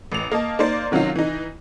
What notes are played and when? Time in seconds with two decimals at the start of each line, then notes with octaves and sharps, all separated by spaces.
0.12 A1 F7
0.32 A#3 D#5 A5
0.59 A#3 D#4 C5 D5
0.91 C3 D#3 F#3 C#4 D#4 F4
1.16 E3 D#4